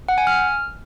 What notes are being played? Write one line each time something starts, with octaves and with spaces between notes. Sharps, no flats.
F#5
G#5
F6